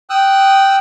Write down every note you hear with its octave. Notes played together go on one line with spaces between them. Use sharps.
G5 D#6 E6 F#6